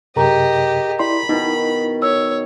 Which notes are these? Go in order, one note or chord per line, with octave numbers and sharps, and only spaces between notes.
F#2 C3 G4 G#4 A#4 D#5 A#5
E4 D5 B5 C6
B2 D#3 D#4 E4
C#5 E6